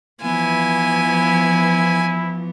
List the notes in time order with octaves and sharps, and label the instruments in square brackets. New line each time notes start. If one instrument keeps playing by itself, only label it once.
[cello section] E3 F3 [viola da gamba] B3 [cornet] E4 [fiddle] G#5